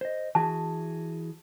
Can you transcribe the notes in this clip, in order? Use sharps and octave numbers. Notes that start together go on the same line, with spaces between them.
C5 D#5
E3 F#4 G#4 A5